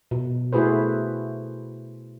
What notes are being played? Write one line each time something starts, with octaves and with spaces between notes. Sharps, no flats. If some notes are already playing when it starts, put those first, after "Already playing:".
B2
A3 E4 F#4 G#4 B4 C5